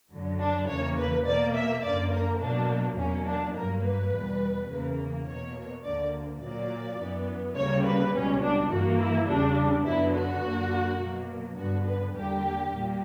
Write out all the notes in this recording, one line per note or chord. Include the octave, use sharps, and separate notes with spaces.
F#2 D3 F#3
D4
E2 C#3 E3 A#3 C#5
B4
B2 A#3 D5
E5
F#2 D3 A#3 D5
A#4
B2 F#3 A#3 D4
E2 B2 F#3 A#3 C#4
D4
G2 F#3 A#3 A#4
B4
E2 B2 G3
E2 C#3 E3 A#3
B2 A#3 C#5
D2 D3 A#3 D5
A#2 F#3 A#3 D5
F#2 E3 B3
D2 C#3 G3 A#3 C#5
B4
C#2 B2 G3 C#4
D4
G2 E3 A#3 F#4
E4
E2 C#3 G3 D4
F#2 D3 F#3 B3 E4
F#4
F#2 D3 A#3
B2 F#3 A#3
G2 D3 G3 B3 F#4
B4
E2 D3 G3 A#3 G4
A#2 G3 A#3